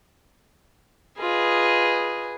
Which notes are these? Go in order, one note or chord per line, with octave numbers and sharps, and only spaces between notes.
F4 G#4 B4 D#5